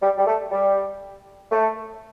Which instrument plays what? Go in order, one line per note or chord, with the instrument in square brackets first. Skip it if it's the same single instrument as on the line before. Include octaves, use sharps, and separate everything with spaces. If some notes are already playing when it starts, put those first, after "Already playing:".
[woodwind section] G3
G3
A3
G3
A3